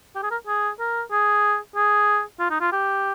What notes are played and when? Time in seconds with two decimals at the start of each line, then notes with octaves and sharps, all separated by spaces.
0.15 G4
0.23 G#4
0.31 A#4
0.47 G#4
0.79 A#4
1.11 G#4
1.76 G#4
2.39 F4
2.51 D#4
2.60 F4
2.72 G4